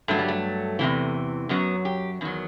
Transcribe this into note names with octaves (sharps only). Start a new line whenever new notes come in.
G2 F#3 A3
G3
A3
E2 C3 E3
F#2 F#3 B3
G4
E2 D#3 F#3